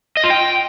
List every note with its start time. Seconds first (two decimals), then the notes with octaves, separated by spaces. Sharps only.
0.17 D#5
0.24 F4
0.30 G5